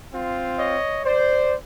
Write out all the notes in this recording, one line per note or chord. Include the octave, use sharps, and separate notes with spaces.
C4 F4
C#5 D#5
C5 D5